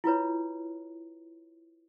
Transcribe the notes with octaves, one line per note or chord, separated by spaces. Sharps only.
E4 F4 B4 C#5